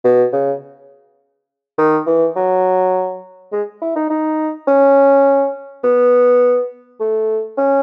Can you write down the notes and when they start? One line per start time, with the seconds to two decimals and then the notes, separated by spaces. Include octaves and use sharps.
0.04 B2
0.33 C#3
1.78 D#3
2.06 E3
2.36 F#3
3.52 G#3
3.82 E4
3.96 D#4
4.10 D#4
4.68 C#4
5.84 B3
7.00 A3
7.58 C#4